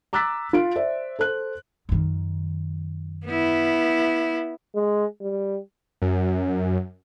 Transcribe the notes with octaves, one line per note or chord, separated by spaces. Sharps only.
A#5 D6 E6 F#6 A6 B6
F4 D7
C5 D5 E5
A4 C5 F#6
F#2 D#3
B3 E4
G#3
G3
F#2